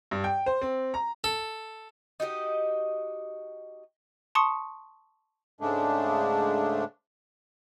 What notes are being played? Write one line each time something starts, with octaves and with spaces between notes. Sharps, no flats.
G2
G5
C5
C4
A#5
A4
D#4 F#4 G4 D#5
A5 C6 C#6 D#6 C#7
G#2 C#3 G#3 A3 D4